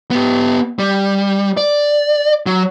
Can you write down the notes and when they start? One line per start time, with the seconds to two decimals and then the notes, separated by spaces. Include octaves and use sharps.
0.11 B3 G4
0.79 G3
1.57 D5
2.46 F#3